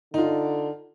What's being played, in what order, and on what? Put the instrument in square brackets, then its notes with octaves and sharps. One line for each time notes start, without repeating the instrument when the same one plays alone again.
[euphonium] D3 [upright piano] D#4 F4